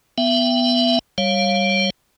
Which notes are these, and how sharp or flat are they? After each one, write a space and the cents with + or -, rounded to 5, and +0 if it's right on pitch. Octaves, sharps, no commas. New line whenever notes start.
B3 +0 E5 +30 G5 +0
G3 +0 C#5 -10 F5 +0